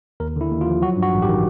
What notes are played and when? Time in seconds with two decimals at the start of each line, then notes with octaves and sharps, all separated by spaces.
0.20 D#2 A#4
0.36 D3 E4
0.51 D#2
0.61 F4
0.67 F3
0.82 F#3 F#4
0.97 G2
1.03 F#4
1.13 A1
1.22 G4
1.28 D#3